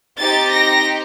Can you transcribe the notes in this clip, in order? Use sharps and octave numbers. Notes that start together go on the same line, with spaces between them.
C4 D#4 G4 A6
A#6